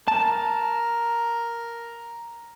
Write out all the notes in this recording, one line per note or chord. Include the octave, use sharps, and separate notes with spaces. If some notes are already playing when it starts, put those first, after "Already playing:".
A#4 A5